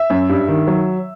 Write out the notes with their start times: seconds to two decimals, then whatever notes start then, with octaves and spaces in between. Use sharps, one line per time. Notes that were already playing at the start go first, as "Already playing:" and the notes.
Already playing: E5
0.10 F#2
0.29 G2
0.48 D#3
0.67 F#3